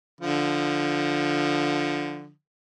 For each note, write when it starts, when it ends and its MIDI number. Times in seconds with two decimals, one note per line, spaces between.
0.21 2.30 50
0.21 2.30 53